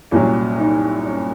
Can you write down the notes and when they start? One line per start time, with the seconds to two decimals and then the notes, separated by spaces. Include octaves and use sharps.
0.11 C2 A#2 F#3 C#4
0.58 D#4
1.05 C#4